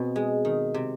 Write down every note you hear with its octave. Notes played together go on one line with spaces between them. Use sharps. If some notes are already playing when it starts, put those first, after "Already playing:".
Already playing: B2 C4
G#3
D#3
C3